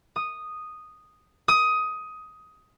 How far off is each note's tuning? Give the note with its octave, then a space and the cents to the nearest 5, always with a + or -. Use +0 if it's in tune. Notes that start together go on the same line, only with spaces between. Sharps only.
D#6 -5
D#6 +15